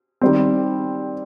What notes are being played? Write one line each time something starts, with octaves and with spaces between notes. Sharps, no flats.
D#3 G3 C4